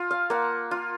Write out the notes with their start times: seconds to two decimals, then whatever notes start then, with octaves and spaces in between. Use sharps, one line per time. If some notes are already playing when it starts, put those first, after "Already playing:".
Already playing: F4
0.11 F5
0.30 A#3 F#5
0.71 F4